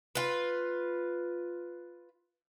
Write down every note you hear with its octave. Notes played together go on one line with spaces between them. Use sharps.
F4 B4